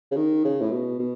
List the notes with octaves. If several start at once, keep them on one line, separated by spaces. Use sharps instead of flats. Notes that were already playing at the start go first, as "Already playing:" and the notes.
C#3
D#3
C#3
A2
B2
B2